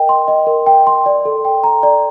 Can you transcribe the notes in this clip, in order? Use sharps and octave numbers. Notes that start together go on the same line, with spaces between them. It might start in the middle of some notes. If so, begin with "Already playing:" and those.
Already playing: A#4 D#5 G5
C6
D#5
A#4
G5
C6
D5
A4
G5
A#5
D5